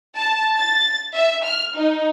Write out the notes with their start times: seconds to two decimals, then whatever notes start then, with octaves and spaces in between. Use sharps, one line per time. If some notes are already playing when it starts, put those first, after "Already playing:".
0.17 A5
0.55 A6
1.15 E5
1.44 F6
1.76 D#4